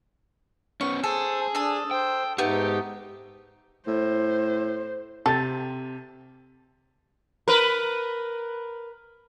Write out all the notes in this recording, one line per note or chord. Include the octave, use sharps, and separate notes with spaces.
B3 C#4 C#6
G#4 A4 C5
D4 A4 D#6
C5 G5
G#2 A3 B3 D#4 G4
A2 C5
C3 G4 A4 A6
A#4 B4